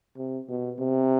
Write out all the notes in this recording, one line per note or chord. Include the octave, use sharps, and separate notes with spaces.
C3
B2
C3